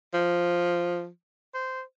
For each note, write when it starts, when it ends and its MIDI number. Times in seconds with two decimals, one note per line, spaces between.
0.14 1.08 53
1.54 1.81 72